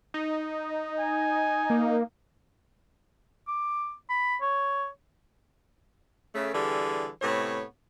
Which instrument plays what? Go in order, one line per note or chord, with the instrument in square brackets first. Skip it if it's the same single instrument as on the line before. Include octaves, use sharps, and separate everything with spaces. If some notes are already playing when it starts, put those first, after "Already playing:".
[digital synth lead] D#4
[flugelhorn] G#5
[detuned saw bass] A#3
[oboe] D6
B5
C#5
[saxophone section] C#3 A3
D3 E3 G3 G#4
A2 C3 B3 C#5